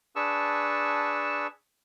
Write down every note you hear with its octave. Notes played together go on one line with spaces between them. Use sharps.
D4 G#4 B4 A5 C#6 E6